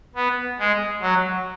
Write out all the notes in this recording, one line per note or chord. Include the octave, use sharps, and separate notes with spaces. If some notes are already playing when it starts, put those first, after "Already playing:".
B3
G#3
F#3